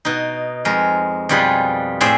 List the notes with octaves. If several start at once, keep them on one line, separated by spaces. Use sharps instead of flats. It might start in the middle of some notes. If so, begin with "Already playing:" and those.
B2 D#4
F2 G#3 A#4
F2 B2 G3 F4 G#4 B5
A2 C4 G#4 C5 D5 E5